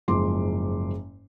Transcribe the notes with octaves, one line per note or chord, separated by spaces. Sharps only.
F#1 G#2 F3 C6 D6